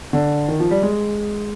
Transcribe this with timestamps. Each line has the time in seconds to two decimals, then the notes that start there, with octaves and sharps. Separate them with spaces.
0.13 D3
0.48 D#3
0.60 F3
0.71 G3
0.83 G#3